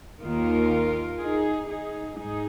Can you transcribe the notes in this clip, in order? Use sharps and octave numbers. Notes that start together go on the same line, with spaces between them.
D#2 D#3 F4 A#4
D#4 G#4
D#4 G#4
G#2 D#4 G#4